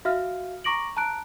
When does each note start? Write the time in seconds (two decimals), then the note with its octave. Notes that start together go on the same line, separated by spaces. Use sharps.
0.05 F#4 E5 F5 F6
0.64 A#5 C#6 D6 A#6 D7 F#7
0.97 A5 A#5 F#6 D7